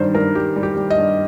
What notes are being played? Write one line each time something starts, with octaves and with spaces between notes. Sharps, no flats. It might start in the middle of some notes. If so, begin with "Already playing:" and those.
Already playing: G2 D#3 G3 C5
G2 A#4
G2 G4
G3
G4
G3
D#5
G2